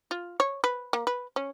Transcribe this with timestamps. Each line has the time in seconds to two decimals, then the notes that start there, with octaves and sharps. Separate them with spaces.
0.11 F4
0.40 C#5
0.64 B4
0.93 A#3
1.07 B4
1.36 C#4